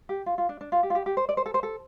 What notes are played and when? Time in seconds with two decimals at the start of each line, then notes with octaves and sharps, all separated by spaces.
0.09 G4
0.26 F4
0.38 F4
0.49 D4
0.61 D4
0.72 F4
0.83 G4
0.90 F4
0.95 G4
1.06 G4
1.17 C5
1.29 D5
1.37 C5
1.46 A4
1.54 C5
1.63 A4